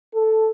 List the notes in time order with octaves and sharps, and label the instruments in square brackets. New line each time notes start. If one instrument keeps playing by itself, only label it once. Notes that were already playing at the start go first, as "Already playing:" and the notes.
[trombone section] A4